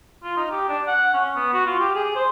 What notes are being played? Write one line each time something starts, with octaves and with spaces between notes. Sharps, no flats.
F4
D#4
G4
D4
F#5
C#4
B3
F#4
F4
G4
G#4
C5